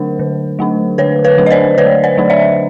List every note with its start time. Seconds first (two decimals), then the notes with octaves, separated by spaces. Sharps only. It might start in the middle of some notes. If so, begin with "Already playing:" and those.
Already playing: D3 F#3 A3 D4 A#4 C5
0.19 D3
0.59 F#3 A3 D4
0.98 D3 B4 C#5
1.24 B4 C#5
1.38 F#3 A3 D4
1.46 D#5
1.50 C5 D5
1.78 D3 B4 C#5
2.04 C5 D5
2.17 F#3 A3 D4
2.30 D5 E5